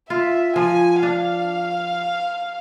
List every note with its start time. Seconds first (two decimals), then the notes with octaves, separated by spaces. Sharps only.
0.10 F4 E5
0.56 F3 G#5
1.03 D4 F5